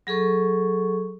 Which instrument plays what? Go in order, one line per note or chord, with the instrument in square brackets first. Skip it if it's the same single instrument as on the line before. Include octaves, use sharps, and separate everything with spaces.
[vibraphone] F#3 G#4 A4 C#6